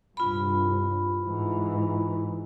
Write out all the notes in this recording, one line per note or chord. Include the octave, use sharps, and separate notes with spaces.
C2 G2 F4 B5
G#2 E3